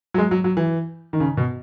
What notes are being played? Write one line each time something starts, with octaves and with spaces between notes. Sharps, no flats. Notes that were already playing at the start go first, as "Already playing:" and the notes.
F#3
G#3
F#3
F#3
E3
D#3
C#3
B2